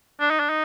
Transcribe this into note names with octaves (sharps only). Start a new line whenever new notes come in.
D4
D#4
D4
D#4